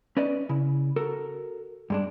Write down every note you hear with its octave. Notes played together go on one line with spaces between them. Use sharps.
C#4 B4 D5 D#5
C#3 E4
F#4 A4 A#4
G2 G#3 D4